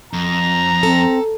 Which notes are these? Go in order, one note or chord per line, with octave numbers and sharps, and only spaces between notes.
F2 A#5
C4 A4